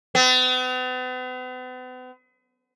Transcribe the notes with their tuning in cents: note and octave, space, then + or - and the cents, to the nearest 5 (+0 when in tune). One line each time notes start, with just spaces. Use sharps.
B3 +45